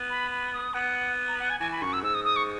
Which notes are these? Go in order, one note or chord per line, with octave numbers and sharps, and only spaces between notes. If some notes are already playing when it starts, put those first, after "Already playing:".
Already playing: B3
B5
B5
D#6
B3 F#5
A#5
F#5
G#5
E3 G#5
B5
F#2 C#6
E6
G#2 E6
D#6
D#6
C#6